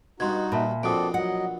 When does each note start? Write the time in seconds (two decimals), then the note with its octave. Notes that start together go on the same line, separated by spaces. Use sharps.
0.20 G2 B2 D#4 F#4 C6 G#6
0.52 A#2 E5 A5 B5
0.83 A#1 B2 C4 A4 D5 D#6 D7
1.14 F#3 D#5 F#5